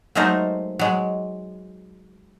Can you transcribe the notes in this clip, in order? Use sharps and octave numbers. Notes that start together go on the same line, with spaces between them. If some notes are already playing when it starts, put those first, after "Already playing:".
F#3 G#3 A3 D#4 A#4 C5
F#3 G#3